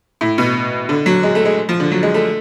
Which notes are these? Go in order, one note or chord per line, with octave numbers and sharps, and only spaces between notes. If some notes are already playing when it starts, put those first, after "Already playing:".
A2
B2
D3
F#3
G#3
A3
G#3
F3
D3
F#3
G#3
A3